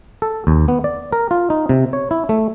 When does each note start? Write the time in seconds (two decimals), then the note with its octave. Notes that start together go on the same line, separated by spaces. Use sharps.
0.22 A4
0.47 D#2
0.68 B3
0.84 D5
1.13 A#4
1.31 F4
1.50 D#4
1.69 C3
1.93 C#5
2.11 E4
2.29 A3